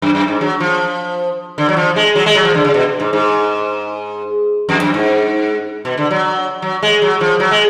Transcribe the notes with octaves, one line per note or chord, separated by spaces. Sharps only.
F#2
F#2
G#2
F#3
F3
D3
F#3
F3
G#3
F#3
G#3
F#3
F3
D3
C#3
B2
G#2
G#2
F2
F#2
G#2
B2
D3
F#3
F#3
G#3
F#3
F3
F#3
G#3